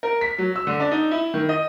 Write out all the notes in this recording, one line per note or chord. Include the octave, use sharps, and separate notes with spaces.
A#4
B6
F#3
E6
D3
D4
D#4
E4
D#3
D#5